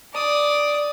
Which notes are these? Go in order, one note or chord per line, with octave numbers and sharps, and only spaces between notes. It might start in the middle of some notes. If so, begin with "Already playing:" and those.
D5 D#6